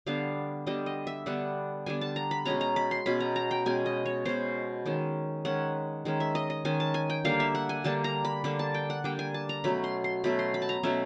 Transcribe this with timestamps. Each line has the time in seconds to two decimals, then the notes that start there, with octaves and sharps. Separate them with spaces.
0.07 D3 G3 B3 D4 F5
0.66 D3 G3 B3 D4 D#5
0.86 D#5
1.07 E5
1.26 D3 G3 B3 D4 F#5
1.86 D3 G3 B3 D4 G#5
2.01 A5
2.16 A#5
2.31 B5
2.46 B2 G#3 C#4 A#5
2.61 A#5
2.76 B5
2.91 C6
3.06 B2 G#3 C#4 B5
3.20 A#5
3.36 A#5
3.51 G5
3.66 B2 G#3 C#4 G#5
3.86 D#5
4.06 C#5
4.25 B2 G#3 C#4 C5
4.86 D#3 G#3 C#4
5.45 D#3 G#3 C#4 F#5
6.05 D#3 G#3 C#4
6.20 E5
6.35 D#5
6.50 D#5
6.65 D#3 G#3 C#4 G#5
6.80 A5
6.94 G#5
7.10 G5
7.25 D3 G3 A#3 D4 F5
7.40 E5
7.55 F#5
7.69 G#5
7.84 D3 G3 A#3 D4 A5
8.04 A#5
8.25 B5
8.44 D3 G3 A#3 D4 B5
8.59 A5
8.74 G5
8.90 F#5
9.04 D3 G3 A#3 D4 G5
9.19 G#5
9.34 A5
9.49 A#5
9.64 B2 F#3 A3 C#4 B5
9.84 C6
10.04 C6
10.24 B2 F#3 A3 C#4 B5
10.39 C6
10.54 B5
10.62 A5
10.69 A#5
10.83 B2 F#3 A3 C#4 E5